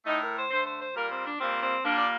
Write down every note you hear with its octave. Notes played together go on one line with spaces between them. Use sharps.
A2 A3 D#4
A#4
C5
D3 A3 C5
C5
C5
A#2 G3 A#3 A#4
C4
D4
A#2 G3 A#3 C4
C4
A#2 G3 A#3 D4
D5